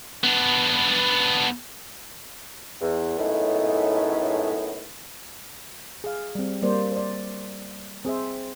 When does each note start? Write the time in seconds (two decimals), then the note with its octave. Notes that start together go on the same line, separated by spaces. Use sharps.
0.24 B3 D4
2.81 E2
3.18 F#2 A2 G#3 A3 B3 D#4
6.04 G#4 F5
6.35 G3 C4
6.62 G3 A#3 C5 D5
6.92 C5 D5
8.05 C4 G#4 C5 E5